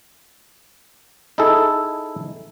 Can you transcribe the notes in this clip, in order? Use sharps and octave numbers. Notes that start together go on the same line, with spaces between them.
D#4 E4 G#4 A4